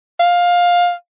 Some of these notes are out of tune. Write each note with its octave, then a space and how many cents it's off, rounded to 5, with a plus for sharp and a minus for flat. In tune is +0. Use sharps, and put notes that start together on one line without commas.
F5 +15